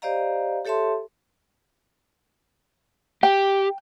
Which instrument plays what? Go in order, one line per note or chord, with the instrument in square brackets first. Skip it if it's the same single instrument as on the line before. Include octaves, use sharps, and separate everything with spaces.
[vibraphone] G4 C5 D5 D#5 F5 A#5
G4 A4 C#5 E5 A5 C6
[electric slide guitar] G4 [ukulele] G5